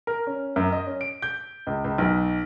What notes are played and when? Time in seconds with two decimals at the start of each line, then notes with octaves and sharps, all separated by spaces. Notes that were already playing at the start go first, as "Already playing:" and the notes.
0.07 A#4
0.27 C#4
0.56 F#2
0.72 D#5
0.87 C#4
1.01 D7
1.22 G6
1.67 C#2
1.84 C#2
1.98 B1